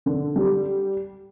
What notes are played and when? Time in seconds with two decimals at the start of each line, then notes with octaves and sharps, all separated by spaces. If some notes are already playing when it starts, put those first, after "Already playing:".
0.06 D3
0.36 G3